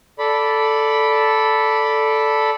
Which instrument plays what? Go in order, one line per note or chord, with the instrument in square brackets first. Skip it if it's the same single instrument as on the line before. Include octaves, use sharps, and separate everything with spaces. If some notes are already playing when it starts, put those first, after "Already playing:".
[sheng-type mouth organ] A4 D5 B5